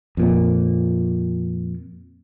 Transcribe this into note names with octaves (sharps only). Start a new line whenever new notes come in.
F2 A#2